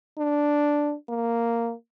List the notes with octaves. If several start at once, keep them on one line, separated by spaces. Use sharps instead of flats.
D4
A#3